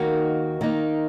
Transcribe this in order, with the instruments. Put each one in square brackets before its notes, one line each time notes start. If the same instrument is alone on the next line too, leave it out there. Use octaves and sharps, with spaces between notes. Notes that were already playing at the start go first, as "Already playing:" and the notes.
Already playing: [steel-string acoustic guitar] D#2 D#3 A#3 D#4 F#4
D#3 A#3 D#4